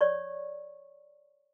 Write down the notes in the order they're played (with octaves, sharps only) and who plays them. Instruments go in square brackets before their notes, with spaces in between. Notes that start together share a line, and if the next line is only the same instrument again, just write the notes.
[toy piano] C#5 D5 C#6